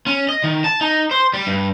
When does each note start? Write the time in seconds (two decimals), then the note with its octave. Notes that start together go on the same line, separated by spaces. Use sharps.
0.07 C#4
0.29 D#5
0.44 D#3
0.64 A5
0.81 D#4
1.11 C5
1.34 G3
1.47 G2